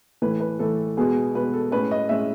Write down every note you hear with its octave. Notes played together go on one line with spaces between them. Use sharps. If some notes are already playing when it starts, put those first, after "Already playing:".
A2 E3 A3 B4
B4
A2 E3 A3 A4
B2 G#3 B3 G#4
B2 G#3 B3 B4
A4
A2 G#3 C#4 B4
D#5
A2 G#3 C#4 E5